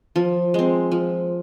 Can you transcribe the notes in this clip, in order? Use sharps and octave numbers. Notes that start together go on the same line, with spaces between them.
F3
G#3 C4
F3